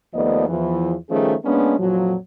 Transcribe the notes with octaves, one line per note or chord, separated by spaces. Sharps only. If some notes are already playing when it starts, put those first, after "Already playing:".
D#2 F3 A3 B3 D5 D#5
E2 E3 F3
D#3 F3 G3 A3 C#4 G#4
G#3 A#3 B3 C#4 D4
F2 A#2 F3 F#3